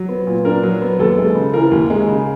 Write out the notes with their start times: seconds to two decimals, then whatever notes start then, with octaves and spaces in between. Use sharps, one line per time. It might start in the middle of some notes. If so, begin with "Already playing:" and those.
Already playing: F#3
0.09 B3
0.27 A#2
0.45 D4 A#4
0.63 F#3
0.82 B3
0.99 D#2 A4
1.18 G#3
1.35 C#3
1.54 E3 A#4
1.71 D#2
1.90 G#3
2.08 C#3